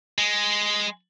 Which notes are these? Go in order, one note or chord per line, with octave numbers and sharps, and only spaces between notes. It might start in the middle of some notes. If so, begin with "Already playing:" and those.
G#3